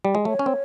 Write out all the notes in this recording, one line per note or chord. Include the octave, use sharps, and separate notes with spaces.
G3
G#3
A3 C#5
C#4
C4